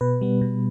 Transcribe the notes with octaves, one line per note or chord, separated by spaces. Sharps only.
B2 B4
G3 B3
B2